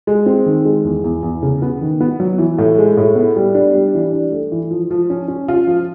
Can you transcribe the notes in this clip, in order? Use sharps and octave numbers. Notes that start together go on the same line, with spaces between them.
G#3
C4
D#3
G#3
E2
E2
E2
C#3
B3
D#3
B3
F#3
E3
A2
G#3
A2
B3
G3
D4
G3
E3
D4
A3
E3
F3
F3
C#4
C#4
F4
F3